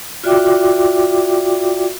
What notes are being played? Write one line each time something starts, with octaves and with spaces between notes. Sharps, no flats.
F4 F#4 D5 E5 G5 D6